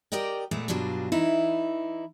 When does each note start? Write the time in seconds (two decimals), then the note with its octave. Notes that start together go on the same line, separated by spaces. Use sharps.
0.12 G4 A#4 D5 D#5 G5
0.51 A#2 G#3 A3 B3
0.68 G2 B2 F#3 G3 D4 F4
1.12 E3 D#4 E4